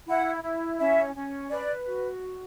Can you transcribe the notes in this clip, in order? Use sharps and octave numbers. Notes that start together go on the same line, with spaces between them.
E4 F#5
E4
C#4 E5
C#4
B4 D5
F#4